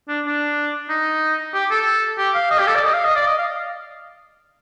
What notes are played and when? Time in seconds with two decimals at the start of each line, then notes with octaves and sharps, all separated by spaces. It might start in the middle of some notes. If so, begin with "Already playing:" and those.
0.08 D4
0.25 D4
0.89 D#4
1.54 G4
1.71 A4
2.18 G4
2.35 F5
2.51 D#5
2.59 G4
2.67 A4
2.75 D5
2.83 D#5
2.94 F5
3.05 D#5
3.16 D5
3.27 D#5
3.38 F5